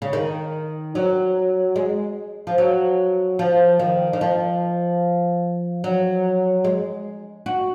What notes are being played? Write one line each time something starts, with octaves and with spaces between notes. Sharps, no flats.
C#3
D#3
F#3
G#3
F3
F#3
F3
D#3
D#3
F3
F#3
G#3
F#4